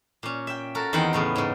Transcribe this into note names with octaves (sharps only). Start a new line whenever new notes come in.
A#2 C#4
E5 G5
F#4 A4 A#4
E2 D#3 C4 A#4 F#5 G5
A2 C#3 B3
G#2 C#3